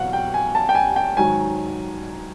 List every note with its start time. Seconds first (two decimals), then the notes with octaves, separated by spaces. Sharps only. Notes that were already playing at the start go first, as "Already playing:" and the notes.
Already playing: E2 B2 F#3 F5 F#5
0.13 G5
0.34 G#5
0.55 A5
0.69 G5
0.75 G#5
0.96 G5
1.17 G#2 D#3 F#3 G#5